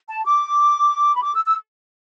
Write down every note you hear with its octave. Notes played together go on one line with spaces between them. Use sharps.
A5
D6
B5
D6
E6
E6